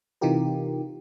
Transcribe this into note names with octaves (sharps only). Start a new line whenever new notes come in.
C3 E3 D#4 F4 G4 A#4